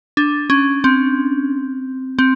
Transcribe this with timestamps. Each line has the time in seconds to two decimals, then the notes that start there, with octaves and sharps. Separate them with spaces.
0.17 D4
0.50 C#4
0.84 C4
2.19 C4